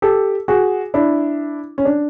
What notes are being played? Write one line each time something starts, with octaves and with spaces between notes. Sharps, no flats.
G4 A4
F#4 G#4
D4 E4
C#4
D4